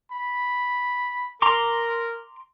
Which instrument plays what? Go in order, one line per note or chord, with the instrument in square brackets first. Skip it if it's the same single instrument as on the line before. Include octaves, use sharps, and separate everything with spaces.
[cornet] B5
[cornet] A#4 [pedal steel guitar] A#5 C6 D6